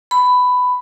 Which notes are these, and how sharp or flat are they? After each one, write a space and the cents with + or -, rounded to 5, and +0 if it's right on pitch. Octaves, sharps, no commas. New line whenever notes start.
B5 +10